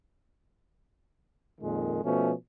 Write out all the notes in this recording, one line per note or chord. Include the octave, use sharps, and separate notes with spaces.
F2 A#2 D#3 G#3
B2 F3 A3 C#4